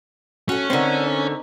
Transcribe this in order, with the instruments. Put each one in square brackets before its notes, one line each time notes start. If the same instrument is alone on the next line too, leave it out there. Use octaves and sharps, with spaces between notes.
[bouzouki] A3 F#4 [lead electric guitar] C#4
[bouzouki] D3 A3 [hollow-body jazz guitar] C4 D#4 A#4